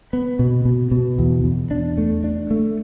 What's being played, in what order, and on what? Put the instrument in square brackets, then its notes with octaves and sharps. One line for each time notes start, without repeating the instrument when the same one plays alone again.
[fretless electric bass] B3
B2
B2
B2
E2
E2
D4
A3
D4
A3